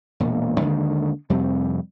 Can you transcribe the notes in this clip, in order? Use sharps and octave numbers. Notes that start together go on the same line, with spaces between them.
E1 A#2
D#2 D3 D#3 G#3
F2 C3 G3 C4